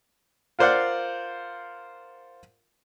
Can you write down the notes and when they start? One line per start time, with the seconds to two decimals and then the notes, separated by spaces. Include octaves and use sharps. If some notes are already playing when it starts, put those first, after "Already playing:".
0.59 F4 A#4 C5 D5 F5 F#5